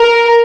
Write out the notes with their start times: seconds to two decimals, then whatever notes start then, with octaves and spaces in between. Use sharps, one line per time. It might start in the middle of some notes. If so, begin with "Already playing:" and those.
Already playing: A#4